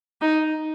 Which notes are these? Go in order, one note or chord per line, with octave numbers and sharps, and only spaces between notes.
D#4